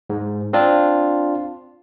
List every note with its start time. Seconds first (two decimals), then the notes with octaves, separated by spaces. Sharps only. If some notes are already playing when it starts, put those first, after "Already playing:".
0.10 G#2
0.53 C4 D4 F4